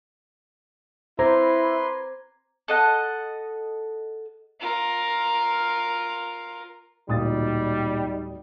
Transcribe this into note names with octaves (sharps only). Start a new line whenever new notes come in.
E4 B4 C5 A#5 C6 D6 G#6
A4 D#5 F#5
F4 A#4
D1 A#2 G3 D#4 D#6 A6